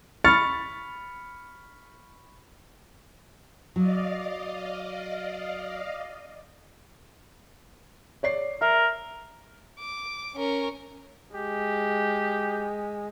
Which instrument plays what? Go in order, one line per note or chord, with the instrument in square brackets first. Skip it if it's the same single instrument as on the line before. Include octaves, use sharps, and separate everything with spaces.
[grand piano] B5 C#6 F6 A6 C#7
[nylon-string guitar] F#3 [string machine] D5 D#5 F5
[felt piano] C#5 D5 C7
[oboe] A#4 [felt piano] E5
[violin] D6
C#4 A#4
[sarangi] G#3 [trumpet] G4